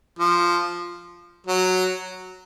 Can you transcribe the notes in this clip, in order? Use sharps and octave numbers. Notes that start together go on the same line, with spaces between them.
F3
F#3